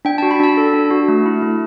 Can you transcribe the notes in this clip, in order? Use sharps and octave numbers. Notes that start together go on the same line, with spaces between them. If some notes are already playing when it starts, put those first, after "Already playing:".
D4 G5
F#4 A5
B5
D4 A5
A4
D4
F#4
A3
E4
A3